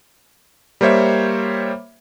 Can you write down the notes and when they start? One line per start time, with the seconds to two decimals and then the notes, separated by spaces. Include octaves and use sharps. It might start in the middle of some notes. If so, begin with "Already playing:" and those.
0.81 G3 A#3 C5 C#5 E5